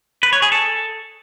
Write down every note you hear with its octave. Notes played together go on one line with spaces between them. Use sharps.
B4
C#5
G#4
A4